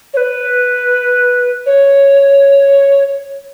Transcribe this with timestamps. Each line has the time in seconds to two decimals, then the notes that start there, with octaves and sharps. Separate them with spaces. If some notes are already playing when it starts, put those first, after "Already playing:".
0.14 C#5
0.17 B4
1.66 C#5